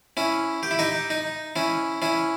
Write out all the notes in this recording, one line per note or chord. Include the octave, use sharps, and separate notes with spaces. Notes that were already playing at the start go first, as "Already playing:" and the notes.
C#4 E4
G4
E4
D#4 G4
D#4
C#4 E4
C#4 E4